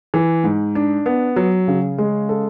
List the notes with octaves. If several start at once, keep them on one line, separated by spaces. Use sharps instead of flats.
E3
G#2
D4
B3
F#3
C#3
G#3
A4